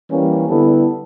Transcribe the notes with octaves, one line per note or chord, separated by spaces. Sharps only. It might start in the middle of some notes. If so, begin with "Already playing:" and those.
E3 G3 A#3 C#4
D3 G3 B3 E4 A4